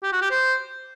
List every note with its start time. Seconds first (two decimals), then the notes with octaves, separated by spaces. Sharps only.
0.03 G4
0.12 F#4
0.22 G4
0.31 C5